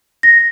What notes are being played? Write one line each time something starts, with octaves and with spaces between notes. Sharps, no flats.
A#6